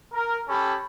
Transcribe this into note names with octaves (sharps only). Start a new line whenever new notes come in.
A#4
C#4 G4 A4 B5